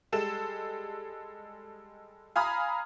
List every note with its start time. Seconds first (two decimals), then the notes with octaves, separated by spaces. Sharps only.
0.12 G3 G#3 A4 E7
2.36 F5 G#5 A#5 B5 D#6 F6